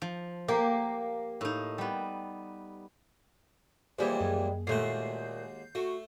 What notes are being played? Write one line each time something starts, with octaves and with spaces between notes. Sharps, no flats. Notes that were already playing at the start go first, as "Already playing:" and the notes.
F3
A#3 G4
A2 D#4
G3 B3
D#2 A#2 E3 G3 G#3 C5
F#2 A#3 G#4
D#2 A#2 G#3 A3 F#4 G6 C7
A3 F#4